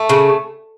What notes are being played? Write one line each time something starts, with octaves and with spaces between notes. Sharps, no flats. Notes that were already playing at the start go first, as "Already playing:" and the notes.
Already playing: A3
C#3